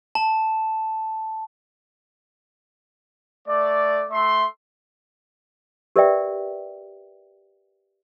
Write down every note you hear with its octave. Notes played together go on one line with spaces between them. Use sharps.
A5
A3 D5
A3 E5 C6
G4 A#4 B4 D5 E5 G5